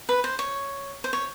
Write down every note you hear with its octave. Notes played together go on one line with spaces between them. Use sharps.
B4
C5
C#5
C5
C#5